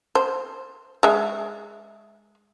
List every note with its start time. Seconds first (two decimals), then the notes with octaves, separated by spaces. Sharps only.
0.15 C5
1.03 G#3 E5